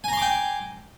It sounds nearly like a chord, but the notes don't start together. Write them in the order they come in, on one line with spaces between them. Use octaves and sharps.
G#5 A#5 C6 D6 G5